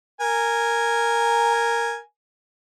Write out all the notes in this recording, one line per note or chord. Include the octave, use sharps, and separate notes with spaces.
A#4 G#5